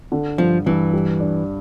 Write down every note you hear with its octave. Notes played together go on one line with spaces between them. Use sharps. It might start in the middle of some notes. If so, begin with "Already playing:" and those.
D3
G2 F3
G2 E3
G3
D4